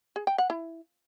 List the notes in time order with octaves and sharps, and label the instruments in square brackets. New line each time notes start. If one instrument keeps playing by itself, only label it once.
[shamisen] G#4
G5
F#5
E4